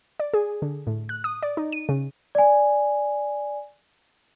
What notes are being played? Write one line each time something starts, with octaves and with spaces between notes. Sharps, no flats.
D5
G#4
D3
A2
F#6
D#6
D5
D#4
D#7
C#3
D5 G#5